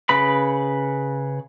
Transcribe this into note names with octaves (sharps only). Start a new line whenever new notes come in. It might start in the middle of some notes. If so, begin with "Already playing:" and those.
C#3 B4 B5